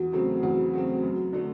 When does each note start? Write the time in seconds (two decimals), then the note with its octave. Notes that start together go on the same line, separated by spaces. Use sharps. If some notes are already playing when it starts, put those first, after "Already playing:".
Already playing: E2 F#4
0.12 C#3 F#3 A3 C4
0.43 E2 F#4
0.73 C#3 F#3 A3 C4
1.02 F#2
1.33 D3 F#3 A3